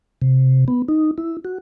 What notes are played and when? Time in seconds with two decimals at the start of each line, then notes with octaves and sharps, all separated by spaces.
0.22 C3
0.68 B3
0.88 D#4
1.18 E4
1.45 F#4